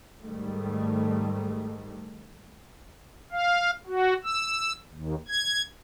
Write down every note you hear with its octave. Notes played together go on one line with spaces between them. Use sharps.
G#2 D#3 G3 A3
F5
F#4
E6
D#2
G#6